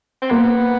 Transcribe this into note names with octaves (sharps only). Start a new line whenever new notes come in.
C4
A#3 B3